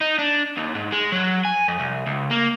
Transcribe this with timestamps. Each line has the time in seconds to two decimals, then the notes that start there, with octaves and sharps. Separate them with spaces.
0.01 D#4
0.18 D4
0.57 D#2
0.75 G#2
0.92 G#3
1.12 F#3
1.45 G#5
1.68 F2
1.80 C2
2.07 C#2
2.31 A#3